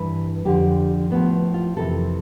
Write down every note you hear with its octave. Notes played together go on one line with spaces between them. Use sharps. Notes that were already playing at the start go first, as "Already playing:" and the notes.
Already playing: G2 E3 B4
F2 D3 F3 G4
A2 F3 B3
F4
F2 C3 E3 A4